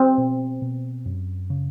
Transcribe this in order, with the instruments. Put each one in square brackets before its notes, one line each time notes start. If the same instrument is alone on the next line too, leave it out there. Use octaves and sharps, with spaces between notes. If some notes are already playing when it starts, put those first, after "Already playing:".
Already playing: [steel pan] C4
[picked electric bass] B2
B2
F#2
C#3